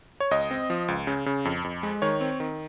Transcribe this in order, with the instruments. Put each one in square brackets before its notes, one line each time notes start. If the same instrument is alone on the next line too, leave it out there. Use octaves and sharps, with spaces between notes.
[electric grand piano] C#5
C#2 D#5
C4
F3
C#2
C#3
C#3
F2
F2
G#3
D#3 C#5
C4
D#3